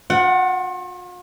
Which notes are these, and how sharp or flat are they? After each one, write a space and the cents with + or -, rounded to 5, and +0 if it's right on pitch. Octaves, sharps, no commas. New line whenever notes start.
F4 +45 F#5 +10